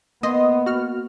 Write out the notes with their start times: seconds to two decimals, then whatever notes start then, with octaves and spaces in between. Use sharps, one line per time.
0.23 A#3 B3 D#5 C6 D#6
0.66 F#4 F6